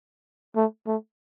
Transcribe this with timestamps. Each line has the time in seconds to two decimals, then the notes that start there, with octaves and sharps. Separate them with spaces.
0.56 A3
0.87 A3